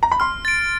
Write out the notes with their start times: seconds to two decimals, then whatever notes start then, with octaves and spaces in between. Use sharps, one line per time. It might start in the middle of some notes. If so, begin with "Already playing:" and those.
0.03 A#5
0.12 B5
0.20 C6 F6
0.45 A6 D7